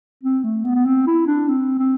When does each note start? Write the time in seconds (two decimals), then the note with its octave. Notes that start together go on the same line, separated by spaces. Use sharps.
0.24 C4
0.44 A3
0.64 B3
0.75 B3
0.86 C4
1.07 E4
1.27 D4
1.48 C4
1.79 C4